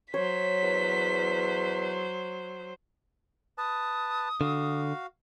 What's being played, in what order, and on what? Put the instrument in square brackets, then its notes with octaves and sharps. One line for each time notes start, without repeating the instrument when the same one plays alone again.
[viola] F#3 C5 [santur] C#5 [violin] B6
[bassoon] E2
[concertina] B4 A5 [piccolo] D#6
[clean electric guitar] D3 [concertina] F#4 F5